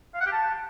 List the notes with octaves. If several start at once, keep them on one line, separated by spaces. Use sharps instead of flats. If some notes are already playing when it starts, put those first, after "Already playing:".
F5
F#5
G4
A5